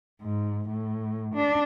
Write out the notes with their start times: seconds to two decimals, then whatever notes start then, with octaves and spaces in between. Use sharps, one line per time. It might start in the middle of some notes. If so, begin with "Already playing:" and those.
0.20 G#2
0.67 A2
1.33 D4